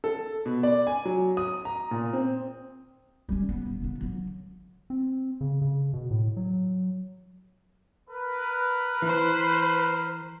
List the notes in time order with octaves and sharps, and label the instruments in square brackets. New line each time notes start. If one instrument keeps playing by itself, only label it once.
[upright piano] A4
B2
D5
G#5
F#3
D#6
A#5
A#2
C4
[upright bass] G3 C#4
B3
D#1
C#3 B3
D3 F#3
[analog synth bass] C4
C#3
C#3
B2
A2
F#3
[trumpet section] A#4 B4
[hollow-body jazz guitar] E3 [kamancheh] C5 B5